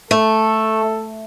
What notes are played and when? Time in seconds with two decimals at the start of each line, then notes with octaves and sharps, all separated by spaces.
0.11 A3 A4